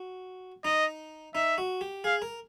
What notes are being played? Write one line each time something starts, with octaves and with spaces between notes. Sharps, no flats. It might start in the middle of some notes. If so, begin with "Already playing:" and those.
Already playing: F#4
D#4 D#5
D#4 E5
F#4
G4
G#4 F5
A#4